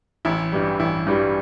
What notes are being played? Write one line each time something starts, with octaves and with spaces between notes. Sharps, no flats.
A1 E4
G2 E3 G3
A1 E4
G2 E3 G3